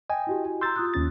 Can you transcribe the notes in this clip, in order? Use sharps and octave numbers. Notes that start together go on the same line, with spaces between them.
D#5 G5 G#5
E4 F#4 G4
A#5 C6 E6 G6 A6
F4 D#6 F#6
D#2 C#4 A6